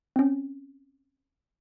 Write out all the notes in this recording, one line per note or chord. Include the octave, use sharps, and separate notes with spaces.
C4 C#4